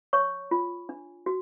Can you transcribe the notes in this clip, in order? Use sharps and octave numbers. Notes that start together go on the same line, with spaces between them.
C#5 C#6
F4
D4
F#4